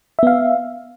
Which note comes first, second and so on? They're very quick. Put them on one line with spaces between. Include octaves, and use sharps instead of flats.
E5 B3 F5